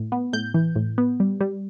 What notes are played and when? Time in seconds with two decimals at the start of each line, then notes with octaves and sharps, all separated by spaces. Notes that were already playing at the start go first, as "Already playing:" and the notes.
Already playing: A2
0.12 B3
0.33 A2 G6
0.54 E3
0.76 A2
0.98 B3
1.20 G3
1.41 G3